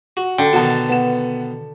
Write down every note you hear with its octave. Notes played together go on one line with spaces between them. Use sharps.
F#4
D3 G5
B2 D#3 F#4 A5
B3 E7